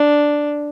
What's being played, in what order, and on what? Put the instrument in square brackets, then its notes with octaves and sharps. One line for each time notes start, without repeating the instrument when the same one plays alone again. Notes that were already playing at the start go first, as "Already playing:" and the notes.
Already playing: [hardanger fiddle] D4